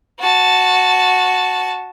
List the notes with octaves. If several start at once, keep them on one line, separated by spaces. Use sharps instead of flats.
F#4 A5